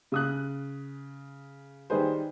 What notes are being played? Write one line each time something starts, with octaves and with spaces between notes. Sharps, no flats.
C#3 D#6 F#6
D#3 G3 D#4 G#4 B4 C5